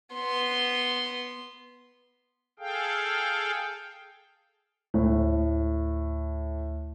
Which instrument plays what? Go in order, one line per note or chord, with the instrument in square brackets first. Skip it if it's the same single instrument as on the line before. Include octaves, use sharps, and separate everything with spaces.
[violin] B3 C6
[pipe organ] G#4 A4 F5 G5
[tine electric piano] D2 [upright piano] A2